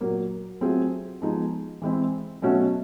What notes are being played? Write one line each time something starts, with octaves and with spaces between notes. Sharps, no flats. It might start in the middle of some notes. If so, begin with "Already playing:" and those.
A#2 F#3 A#3
F#3 A3 C4 F4 G#4
F3 G#3 B3 D#4 G#4
E3 G#3 C4 E4
B2 F#3 A3 C#4 F#4